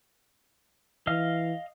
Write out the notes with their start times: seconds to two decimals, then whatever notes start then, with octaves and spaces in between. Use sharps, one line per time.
1.07 E3 D#5 F5 F6